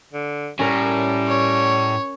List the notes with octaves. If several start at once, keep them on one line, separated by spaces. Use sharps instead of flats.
D3
A2 G3 C#4 A#4
C#5